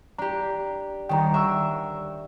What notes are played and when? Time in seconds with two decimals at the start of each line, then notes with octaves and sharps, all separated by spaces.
0.18 D4 G4 A#5
1.09 D#1 D#3 G5 A#5
1.34 D4 E5 A#5 C#6 E6